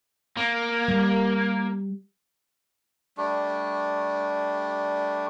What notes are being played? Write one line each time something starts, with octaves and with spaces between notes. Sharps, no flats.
A#3
G3
G3 A3 D4